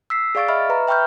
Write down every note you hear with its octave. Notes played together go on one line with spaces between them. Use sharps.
E6 B6 C7
G#4 D5 F5 C#6 A6 D7
D#5 E5 B5 C#6 F6
B4 A#5
E5 G5 B5 C#6 F6 G6